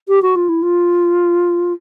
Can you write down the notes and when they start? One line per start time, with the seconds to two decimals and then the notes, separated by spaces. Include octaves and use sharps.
0.08 G4
0.22 F#4
0.35 F4
0.48 E4
0.62 F4